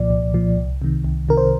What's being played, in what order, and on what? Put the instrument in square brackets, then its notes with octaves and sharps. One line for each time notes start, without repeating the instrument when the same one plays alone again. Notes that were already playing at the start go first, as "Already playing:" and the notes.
Already playing: [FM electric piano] C2 A#2 F3 D5
C2
A#2 F3
C2
C3 D#3
C2
C3 D#3 A#4
C5